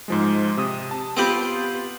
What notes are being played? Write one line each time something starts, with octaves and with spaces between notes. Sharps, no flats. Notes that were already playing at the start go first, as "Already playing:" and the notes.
G#2 F3 G#3
C3 D#6
A5
B3 C4 F4 G4 B4 G6